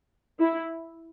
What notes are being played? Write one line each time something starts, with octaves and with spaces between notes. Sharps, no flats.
E4